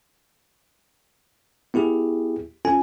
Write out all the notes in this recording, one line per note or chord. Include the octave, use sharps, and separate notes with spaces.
B3 E4 G4 G#4
C#4 F4 A4 G#5